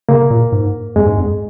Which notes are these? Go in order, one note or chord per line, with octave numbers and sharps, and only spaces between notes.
C#3 A#3
A#2
G#2
F2 G#3
G#2
F2